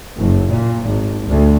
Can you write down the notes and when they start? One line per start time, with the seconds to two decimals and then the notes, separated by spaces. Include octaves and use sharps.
0.16 F#1
0.49 A#2
0.84 G#1
1.27 D2